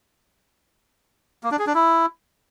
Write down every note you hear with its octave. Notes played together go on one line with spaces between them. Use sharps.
A#3
D4
G#4
D4
E4